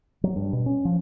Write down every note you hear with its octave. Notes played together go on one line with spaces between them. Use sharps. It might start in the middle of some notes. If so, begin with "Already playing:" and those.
F#3
G2
B2
C#4
F3